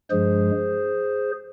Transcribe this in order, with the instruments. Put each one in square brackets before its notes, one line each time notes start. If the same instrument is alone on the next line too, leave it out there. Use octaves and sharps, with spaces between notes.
[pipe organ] G2 F3 G#3 G#4 C5